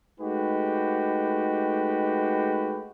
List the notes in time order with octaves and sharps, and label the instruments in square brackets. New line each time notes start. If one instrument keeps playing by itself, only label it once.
[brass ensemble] G#3 A3 D#4 F#4 G4 B4